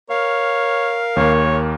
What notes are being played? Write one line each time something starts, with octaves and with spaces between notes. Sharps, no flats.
A#4 C#5 F5
D#2 A#3 C#5